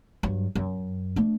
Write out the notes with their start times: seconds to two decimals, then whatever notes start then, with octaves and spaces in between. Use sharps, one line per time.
0.23 G2 F#3
0.55 F#2
1.16 A3 D4